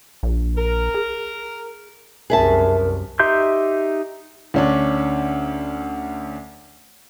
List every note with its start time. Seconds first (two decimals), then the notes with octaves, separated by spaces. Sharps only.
0.23 A#1
0.57 A#4
0.94 G#4
2.30 C2 F#2 G#4 A#4 E5 A5
3.19 D#4 G4 E5 C6 G6
4.54 D2 C#4 D4